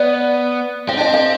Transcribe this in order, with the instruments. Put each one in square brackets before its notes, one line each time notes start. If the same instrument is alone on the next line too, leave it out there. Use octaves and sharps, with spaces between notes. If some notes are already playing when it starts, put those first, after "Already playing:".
Already playing: [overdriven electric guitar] B3 [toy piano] D5
[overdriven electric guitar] C4 [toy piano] F5
[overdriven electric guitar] D4
[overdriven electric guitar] C4 [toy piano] D#5
[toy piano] F5